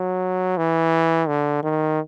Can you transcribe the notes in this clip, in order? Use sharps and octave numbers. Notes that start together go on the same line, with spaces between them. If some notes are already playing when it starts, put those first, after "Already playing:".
Already playing: F#3
E3
D3
D#3